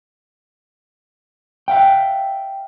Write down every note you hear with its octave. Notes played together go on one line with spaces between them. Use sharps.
E5 F5 G5